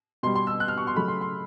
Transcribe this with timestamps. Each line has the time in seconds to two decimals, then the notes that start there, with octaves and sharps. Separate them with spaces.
0.23 B2 C6
0.27 G3
0.35 C6
0.47 E6
0.60 F#6
0.68 F6
0.78 C#6
0.87 C6
0.96 C#3 F#3 A3 B5
1.08 C6
1.21 C6